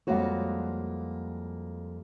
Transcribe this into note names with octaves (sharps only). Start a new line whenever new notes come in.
F2 G3 G#3 A#3 F#4 C#5